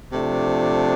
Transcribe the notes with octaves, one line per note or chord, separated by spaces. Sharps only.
C3 F3 A3 D4